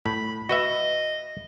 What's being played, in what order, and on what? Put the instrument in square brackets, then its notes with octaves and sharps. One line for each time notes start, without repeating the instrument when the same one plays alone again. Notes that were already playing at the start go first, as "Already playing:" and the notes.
[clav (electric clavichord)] A2 [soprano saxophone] B5
[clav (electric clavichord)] F#4 B4 E5 [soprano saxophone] D#5